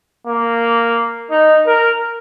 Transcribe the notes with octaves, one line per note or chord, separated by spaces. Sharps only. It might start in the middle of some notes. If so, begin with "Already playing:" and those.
A#3
D#4
A#4